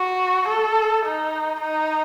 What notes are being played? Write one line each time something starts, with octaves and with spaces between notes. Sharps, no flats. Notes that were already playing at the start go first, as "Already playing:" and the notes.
Already playing: F#4
A4
D#4
D#4